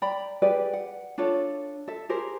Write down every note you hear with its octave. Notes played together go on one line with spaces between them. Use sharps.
D5 G5 A#5 B5
G4 G#4 B4 D5
F#5
D4 F4 A4 C#5
A4 E5
G4 G#4 A#4 C5